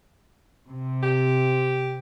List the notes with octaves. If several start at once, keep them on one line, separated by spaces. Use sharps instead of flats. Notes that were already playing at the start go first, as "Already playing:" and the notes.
C3
G4